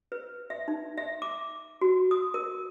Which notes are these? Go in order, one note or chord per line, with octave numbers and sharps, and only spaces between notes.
B4
E5
D#4
E5
D6
F#4
D#6
A#4